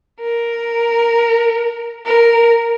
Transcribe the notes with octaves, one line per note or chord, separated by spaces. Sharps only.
A#4
A#4